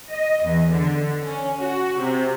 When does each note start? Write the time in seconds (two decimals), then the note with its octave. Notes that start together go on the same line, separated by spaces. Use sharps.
0.14 D#5
0.45 E2
0.74 D3
1.24 C#4
1.62 F#4
2.00 C3